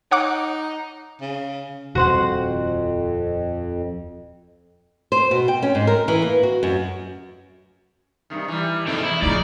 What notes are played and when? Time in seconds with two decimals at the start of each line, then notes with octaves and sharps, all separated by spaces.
0.11 D#4 C#5 F#5 D6
1.21 C#3
1.95 D#1 F2 F#4 C5 F#5
5.12 C5
5.31 B2
5.48 G5
5.62 C#4
5.75 G#2
5.87 A#4
6.08 E3
6.22 A#3
6.43 F#4
6.63 F#2
8.30 G2 C3 D#3
8.48 E3 G3
8.87 F2 C3 D#3 G#3 A3
9.03 E2 B2 E4
9.22 A#1 C#3 F3 D#4 D5